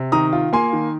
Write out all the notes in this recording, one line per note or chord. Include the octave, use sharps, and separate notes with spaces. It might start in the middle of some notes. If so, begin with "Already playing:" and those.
Already playing: C3
D#3 A#5 D#6
F4
A#3 G#5 C6
D#3